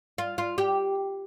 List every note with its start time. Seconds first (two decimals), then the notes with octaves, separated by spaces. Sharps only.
0.18 F4
0.38 F4
0.58 G4